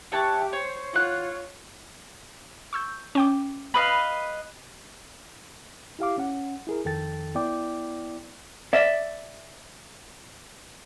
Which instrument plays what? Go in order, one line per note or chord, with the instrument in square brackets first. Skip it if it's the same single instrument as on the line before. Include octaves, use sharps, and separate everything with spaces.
[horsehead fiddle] G4 E5 [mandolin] C#5 A5 F#6
[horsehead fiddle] C5 [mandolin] C#5
[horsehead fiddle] F4 C#5 [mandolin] F#5 F#6
[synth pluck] C#6 E6 G6
C#4 G5 D6
[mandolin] B4 D#5 F5
[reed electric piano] E4 G4 F5 D6
C#4 F#5
E4 G#4 A#4
F2 D#3 A4 G5 A6
B3 E4 D5 G5 D6
[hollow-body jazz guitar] D5 E5